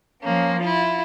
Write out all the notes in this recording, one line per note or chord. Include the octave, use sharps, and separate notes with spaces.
F3 A#3 C#4
E4 F4